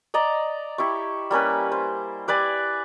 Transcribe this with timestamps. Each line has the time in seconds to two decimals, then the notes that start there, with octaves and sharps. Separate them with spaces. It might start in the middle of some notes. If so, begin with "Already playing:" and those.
0.14 D5 D#5 A#5
0.78 E4 G4 C#6
1.31 G3 A#3 C#4 B4
1.72 C5
2.28 G4 B4 D5 G#5